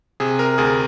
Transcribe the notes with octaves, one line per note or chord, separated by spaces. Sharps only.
C3 G#4
A#4
D2 G#4